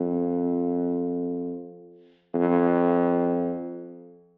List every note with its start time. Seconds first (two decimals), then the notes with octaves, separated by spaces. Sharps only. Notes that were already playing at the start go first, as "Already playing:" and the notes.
Already playing: F2
2.34 F2